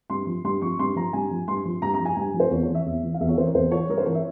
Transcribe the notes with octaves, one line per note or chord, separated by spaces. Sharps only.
G2 C6
F3
G2 C6
F3 C#6
G2 C6
F3 A#5
G2 G#5
F3
G2 C6
F3
G2 A#5
A#5
F3
G#5
G2 G#5
F3
C5
E2 C#5
C#5
E3
E5
E2
E3
F5
E2 E5
C#5
E3 C5
A#4
E2 C5
E3 C#5
G2 A#4
C5
E3 C#5
E5